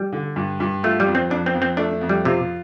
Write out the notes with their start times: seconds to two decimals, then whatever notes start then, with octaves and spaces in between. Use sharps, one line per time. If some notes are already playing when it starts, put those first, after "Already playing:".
Already playing: G3
0.13 D3
0.36 G2
0.60 G2
0.83 A3 F4
1.00 G3
1.07 F2
1.15 C4
1.30 F2 D4
1.46 C4
1.54 F2
1.62 C4
1.77 A3 D4
2.01 F2
2.09 G3
2.25 C3 F4